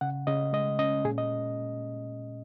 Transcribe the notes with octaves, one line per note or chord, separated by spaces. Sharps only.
C#3 F#5
C#3 D#5
G#3 D#5
C#4 D#5
A#2 G#4
D#5